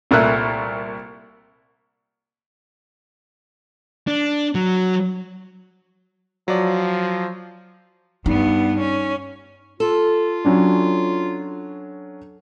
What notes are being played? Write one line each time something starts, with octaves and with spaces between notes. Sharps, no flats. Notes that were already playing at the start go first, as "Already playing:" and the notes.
C2 A#2 A3 E5 F#6
D4
F#3
F3 F#3 D5
G2 B3 D#4
C#4
F4 A4
F#3 C#4 D4